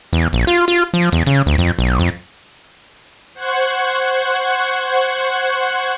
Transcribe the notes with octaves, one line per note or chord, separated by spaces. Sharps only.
E2
A#1
F4
F4
F3
E2
C#3
D2
F2
B1
F2
C5 F#5 C#6 F#6 G#6